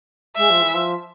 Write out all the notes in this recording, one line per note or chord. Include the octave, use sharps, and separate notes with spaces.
G#3 E5
F3
E3
F3